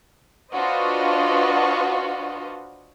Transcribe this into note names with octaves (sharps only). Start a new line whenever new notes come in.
D4 F4 F#4 B4 C5 D#5